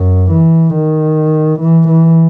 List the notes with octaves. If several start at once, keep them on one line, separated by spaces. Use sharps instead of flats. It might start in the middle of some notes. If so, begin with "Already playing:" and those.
Already playing: F#2
E3
D#3
E3
E3